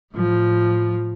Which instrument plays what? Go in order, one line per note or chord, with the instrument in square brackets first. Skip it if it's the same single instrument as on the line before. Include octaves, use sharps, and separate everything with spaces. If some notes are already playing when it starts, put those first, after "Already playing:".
[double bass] A2 F3